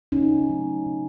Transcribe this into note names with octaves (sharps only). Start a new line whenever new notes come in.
C#3 C#4 D#4
F#3 A3
C#3